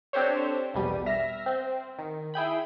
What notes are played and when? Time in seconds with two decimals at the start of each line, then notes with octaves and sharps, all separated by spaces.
0.13 C4 D4 G4 A4 C5 C#5
0.74 A#1 E2 B2 G3 D#7
1.06 E5 F6 A#6
1.46 C4
1.99 D#3
2.34 E4 G#4 G5 B5